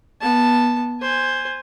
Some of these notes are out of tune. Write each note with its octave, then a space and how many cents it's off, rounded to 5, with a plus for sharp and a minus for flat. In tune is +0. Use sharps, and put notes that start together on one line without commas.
B3 -25 A5 +0
C5 +0 G#5 -10